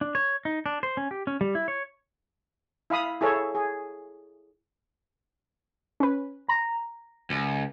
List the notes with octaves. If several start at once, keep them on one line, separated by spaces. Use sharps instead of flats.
D4
C#5
D#4
D4
C5
C#4
G4
C#4
G3
E4
C#5
E4 F5 B5 D#6
E4 G#4 A4 C#5
G#4
C#4 B4
A#5
C#2